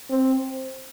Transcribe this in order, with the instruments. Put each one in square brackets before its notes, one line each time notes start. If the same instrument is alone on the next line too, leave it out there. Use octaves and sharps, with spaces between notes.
[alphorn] C4